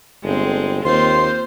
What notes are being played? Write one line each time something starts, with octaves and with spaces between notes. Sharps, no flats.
G1 G#3 C4
D#2 A#3 C4 F4 C5 C6